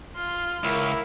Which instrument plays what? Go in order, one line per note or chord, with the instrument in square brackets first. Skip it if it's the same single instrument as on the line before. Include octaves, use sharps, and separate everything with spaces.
[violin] F4 C6 [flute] F6
[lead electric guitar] C#2 [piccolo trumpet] E4 [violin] A#4